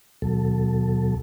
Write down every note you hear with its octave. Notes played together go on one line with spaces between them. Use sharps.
D#2 B2 F#3 A4